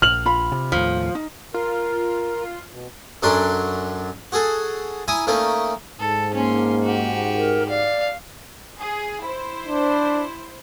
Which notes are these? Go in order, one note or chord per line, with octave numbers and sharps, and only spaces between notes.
A#1 F6 F#7
F4 B5
C3
D#2 A2 F3
D#4
F4 A#4
B2
F#2 F#3 C#4 D4 A4 C6
F#4 G#4 A4
E4 G#5 A#5 D#6
A3 A#3 C#4 D#4
G#2 A4
A#3 C#4 C6
F#4 G4
A#4
D5 F5
G#4
E4 C5
D4